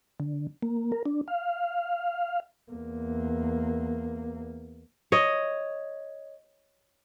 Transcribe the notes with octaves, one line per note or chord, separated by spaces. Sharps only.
D3
A#3
A#4
D4
F5
E2 A#3
C#5 D#5